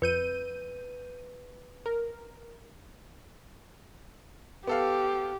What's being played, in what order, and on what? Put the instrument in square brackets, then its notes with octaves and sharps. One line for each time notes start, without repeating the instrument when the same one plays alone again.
[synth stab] F2 G6 D#7 [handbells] B4
[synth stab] A#4
[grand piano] B3 A4 F5 [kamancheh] G4